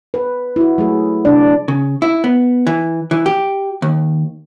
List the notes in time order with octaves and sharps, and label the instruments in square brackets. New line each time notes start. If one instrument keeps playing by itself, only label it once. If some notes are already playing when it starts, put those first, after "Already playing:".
[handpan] B4
E4 F#4
F#3 A3 G#4
C3 D4 D5
[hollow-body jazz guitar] C#3
E4
B3
E3
E3
G4
D#2